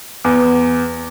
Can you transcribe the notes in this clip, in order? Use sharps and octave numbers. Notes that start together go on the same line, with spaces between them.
E2